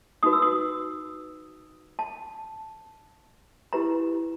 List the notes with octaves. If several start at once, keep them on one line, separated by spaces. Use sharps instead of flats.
D#4 F#4 B4 D#6
E6
D#6
A5
E4 G4 B4 A#5